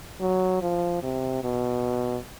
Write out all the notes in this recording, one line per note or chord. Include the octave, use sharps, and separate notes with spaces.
F#3
F3
C3
B2